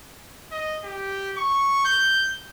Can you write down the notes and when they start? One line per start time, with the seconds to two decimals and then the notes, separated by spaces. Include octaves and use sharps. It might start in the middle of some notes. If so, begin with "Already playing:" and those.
0.52 D#5
0.84 G4
1.37 C#6
1.85 G6